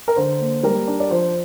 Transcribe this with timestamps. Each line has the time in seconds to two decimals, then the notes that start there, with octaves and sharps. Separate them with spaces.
0.08 A#4
0.16 D3 C5
0.40 A#3
0.63 G3 A#4
0.87 D4
1.00 D5
1.10 F3 C5